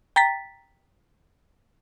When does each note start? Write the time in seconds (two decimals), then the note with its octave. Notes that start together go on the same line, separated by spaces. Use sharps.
0.16 G5 A#5 A6 B6